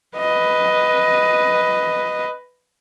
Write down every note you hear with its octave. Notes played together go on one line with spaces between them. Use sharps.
B4 D#5